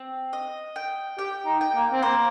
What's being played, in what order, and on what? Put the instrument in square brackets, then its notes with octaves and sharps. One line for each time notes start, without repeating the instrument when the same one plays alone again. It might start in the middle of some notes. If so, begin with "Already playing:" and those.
Already playing: [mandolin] C4
D#5
G5
[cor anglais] G4 [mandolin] G5
[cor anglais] D#4
[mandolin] G5
[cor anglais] A#3
C4
[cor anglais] A#3 [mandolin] C5